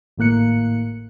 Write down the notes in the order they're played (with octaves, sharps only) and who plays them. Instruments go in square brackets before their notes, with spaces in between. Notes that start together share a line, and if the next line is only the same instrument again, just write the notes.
[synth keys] G#1 A2 A#3 F#6 C#7